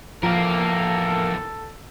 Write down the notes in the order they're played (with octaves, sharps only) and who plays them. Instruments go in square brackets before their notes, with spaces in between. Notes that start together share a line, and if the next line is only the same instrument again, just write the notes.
[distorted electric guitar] E2 A2 [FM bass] F3 [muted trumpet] A4 [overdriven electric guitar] A#4 F5